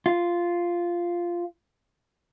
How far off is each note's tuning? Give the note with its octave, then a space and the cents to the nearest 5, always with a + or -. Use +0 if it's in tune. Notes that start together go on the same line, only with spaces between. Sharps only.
F4 -5